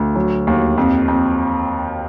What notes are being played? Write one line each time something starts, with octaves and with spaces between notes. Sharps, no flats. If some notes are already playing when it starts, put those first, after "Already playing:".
Already playing: D2
F#3
D#2
F2
F2